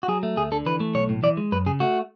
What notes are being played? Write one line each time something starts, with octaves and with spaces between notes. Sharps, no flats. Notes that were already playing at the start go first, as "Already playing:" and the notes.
F#4
F#3 G#4
A3
D2 G#4
D3 A4
E3 B4
A3
B1 C#5
A2
E3 D5
G#3
F#2 B4
C#3 G#4
A3 F#4